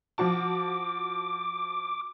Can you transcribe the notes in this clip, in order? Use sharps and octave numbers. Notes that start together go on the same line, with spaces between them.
F3 F#4 A5 D6